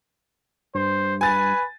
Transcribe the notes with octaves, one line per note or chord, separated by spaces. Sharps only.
G2 C5
B4 G#5 A6